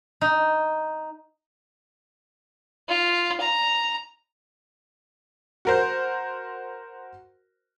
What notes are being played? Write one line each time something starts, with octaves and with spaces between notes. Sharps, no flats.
D#4
F4
A#5
F#4 A#4 C5